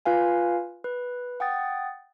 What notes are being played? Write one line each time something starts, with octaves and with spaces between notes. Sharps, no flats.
F4 B4 F5 G#5
B4
F#5 G5 D#6 A6